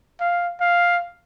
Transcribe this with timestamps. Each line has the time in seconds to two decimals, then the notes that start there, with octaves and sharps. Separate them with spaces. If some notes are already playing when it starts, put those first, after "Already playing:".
0.20 F5
0.61 F5